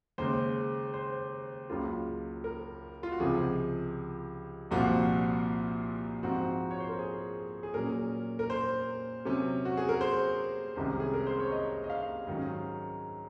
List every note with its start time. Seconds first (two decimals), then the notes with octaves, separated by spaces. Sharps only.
0.18 D#2 C#3 G#3 C5
0.94 C5
1.69 C#2 C#3 F#3 A#3 F4
2.44 A#4
3.03 F4
3.12 F#4
3.20 C#2 C3 F3 G#4
4.71 C2 A#2 F3 C4 F4 F#4
6.23 G#2 F3 C4 F4 F#4
6.71 C#5
6.80 C5
6.89 A#4
6.99 G#4
7.63 G#4
7.74 A#2 F#3 C#4 A#4
8.39 A#4
8.50 C5
9.25 C3 F#3 C#4
9.65 F#4
9.77 G#4
9.89 A#4
10.01 C5
10.76 C2 C3 D#3 G#3 C#4
11.00 G#4
11.14 A#4
11.27 C5
11.40 C#5
11.52 D#5
11.84 D#5
11.90 F5
12.27 G#2 D#3 F#3 C#4